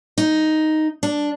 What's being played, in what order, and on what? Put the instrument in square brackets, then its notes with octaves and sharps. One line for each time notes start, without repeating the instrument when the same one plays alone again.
[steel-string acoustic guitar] D#4
D4